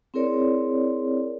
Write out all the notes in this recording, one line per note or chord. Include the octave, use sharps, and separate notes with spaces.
C4 E4 G#4 A#4 C#5 D5